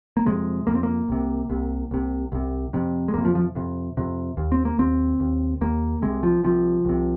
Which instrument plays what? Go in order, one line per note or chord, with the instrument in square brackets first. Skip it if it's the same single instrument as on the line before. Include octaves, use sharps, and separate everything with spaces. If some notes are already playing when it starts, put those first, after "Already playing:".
[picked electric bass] A#3
F2 C3 G#3
F2 C3 A#3
C4
A#3
C2 C3
C2 C3
C2 C3
C2 C3
F2 C3
G#3
F2 C3 A#3
F3
F3
F2 C3
F2 C3
D#2
C4
A#3
D#2 C4
D#2
D#2 A#3
C2 C3 G#3
F3
C2 C3 F3
C2 C3